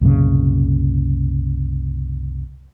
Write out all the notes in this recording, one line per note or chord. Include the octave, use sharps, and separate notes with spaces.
C2 F#2 A#2 C#3